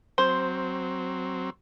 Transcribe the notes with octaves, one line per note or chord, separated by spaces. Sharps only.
F#3 C4 C5